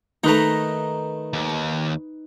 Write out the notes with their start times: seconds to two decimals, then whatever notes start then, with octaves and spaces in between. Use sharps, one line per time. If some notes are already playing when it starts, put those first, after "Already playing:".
0.24 D#3 A3 D#4 B4 A#5
1.33 D#2